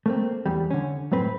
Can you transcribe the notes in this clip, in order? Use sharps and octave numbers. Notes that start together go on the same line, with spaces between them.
A3 A#3 C4
E2 G3
D3 C#4
F#2 A2 C4 B4